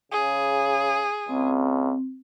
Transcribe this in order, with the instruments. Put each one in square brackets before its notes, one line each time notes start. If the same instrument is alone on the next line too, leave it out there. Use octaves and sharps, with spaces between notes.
[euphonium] C#3 [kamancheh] G#4
[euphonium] C#2 [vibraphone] C4